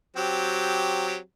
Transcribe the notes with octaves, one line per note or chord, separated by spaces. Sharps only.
F#3 C4 G4